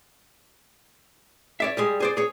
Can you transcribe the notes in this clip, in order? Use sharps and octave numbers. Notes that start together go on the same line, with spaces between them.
C#5 D5 E5
G3 G#3 G#4
G#4 C5 D5
G#4 C#5